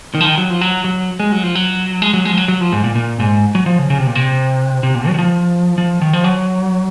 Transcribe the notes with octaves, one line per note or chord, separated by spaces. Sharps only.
D#3
F3
D#3
F#3
F3
F#3
F#3
G#3
F#3
F3
F#3
G#3
F#3
G#3
F3
F#3
F#3
F3
G#2
A#2
A#2
G#2
F#3
F3
C#3
C#3
C3
A#2
C3
C3
A#2
F#3
D#3
F3
F3
D#3
F3
F#3